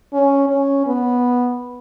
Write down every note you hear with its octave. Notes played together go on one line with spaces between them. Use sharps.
C#4
C#4
B3